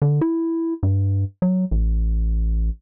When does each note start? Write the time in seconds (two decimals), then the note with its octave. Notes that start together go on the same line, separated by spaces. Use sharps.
0.02 D3
0.21 E4
0.83 G2
1.42 F#3
1.71 A1